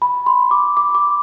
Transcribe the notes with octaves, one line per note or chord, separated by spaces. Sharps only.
B5
C6
D6
D6
D6